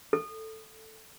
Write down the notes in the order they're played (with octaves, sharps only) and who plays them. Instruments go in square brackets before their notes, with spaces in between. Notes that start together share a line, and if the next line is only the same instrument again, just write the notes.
[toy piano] A4